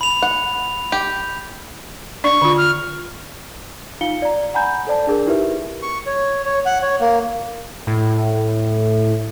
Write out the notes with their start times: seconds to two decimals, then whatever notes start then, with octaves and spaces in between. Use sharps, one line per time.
0.01 B5 F7
0.23 F#5
0.92 G4
2.24 D4 D5 C#6
2.42 D3 F4
2.58 F6
4.01 D#4 F4 F5 C#7 G7
4.22 D5 A#5
4.54 F#5 G#5 A#5 B5 G6
4.87 A4 C5 D5 A5
5.07 D4 G#4 A#4
5.26 D#4 E4 G4 A#4 B4 E5
5.83 C#6
6.06 C#5
6.45 C#5
6.66 F#5
6.82 C#5
7.00 A#3
7.87 A2